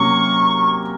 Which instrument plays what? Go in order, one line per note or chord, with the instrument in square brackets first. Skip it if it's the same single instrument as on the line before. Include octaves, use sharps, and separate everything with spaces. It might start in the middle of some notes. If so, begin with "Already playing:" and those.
Already playing: [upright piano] C3 F#3 A#3 C#4 [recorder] C#6